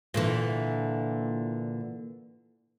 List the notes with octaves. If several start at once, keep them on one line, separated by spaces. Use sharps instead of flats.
A#2 D3 E3